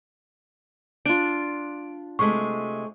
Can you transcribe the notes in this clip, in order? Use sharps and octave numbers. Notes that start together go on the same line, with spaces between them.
D4 F4 D7
C3 G#3 A3 C#6